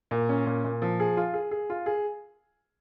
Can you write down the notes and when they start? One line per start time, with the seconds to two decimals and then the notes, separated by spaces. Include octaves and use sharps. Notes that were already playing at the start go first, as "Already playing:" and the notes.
0.11 A#2
0.29 C#4
0.46 A#2
0.64 A#2
0.82 F3
1.00 G#4
1.17 F4
1.34 G#4
1.51 G#4
1.70 F4
1.86 G#4